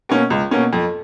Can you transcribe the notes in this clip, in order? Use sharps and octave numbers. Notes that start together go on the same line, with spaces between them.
B2 A#3 C#4
C#2
B2 A#3 C#4
F2